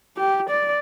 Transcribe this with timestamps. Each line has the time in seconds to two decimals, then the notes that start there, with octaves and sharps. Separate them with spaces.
0.17 G4
0.50 D5